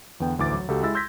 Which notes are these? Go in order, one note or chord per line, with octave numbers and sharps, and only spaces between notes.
E2 D3 B3 G5
A1 D2 E3 D6 A6
F#3
C#2 F#4 G4 A4
G#3 E4 E6 A6
C6 E6 G6 G#6 A#6 B6